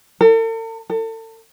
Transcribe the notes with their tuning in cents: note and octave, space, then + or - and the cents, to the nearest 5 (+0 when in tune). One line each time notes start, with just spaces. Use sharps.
A4 +45
A4 +35